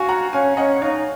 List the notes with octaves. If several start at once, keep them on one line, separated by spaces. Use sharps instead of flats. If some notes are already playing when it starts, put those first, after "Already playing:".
Already playing: F#4 F5 G#5
F#5 A#5
C#4 F5 G#5
C#4 D#5 F#5
D#4 C#5 F5